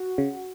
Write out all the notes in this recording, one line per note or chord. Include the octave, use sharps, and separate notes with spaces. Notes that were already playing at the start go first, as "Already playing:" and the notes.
Already playing: F#4
C#3